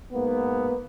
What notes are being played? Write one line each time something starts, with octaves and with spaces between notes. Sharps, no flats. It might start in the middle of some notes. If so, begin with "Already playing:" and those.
G#2 A#3 B3